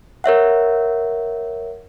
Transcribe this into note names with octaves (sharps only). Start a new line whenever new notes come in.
A#4 C#5 E5 F#5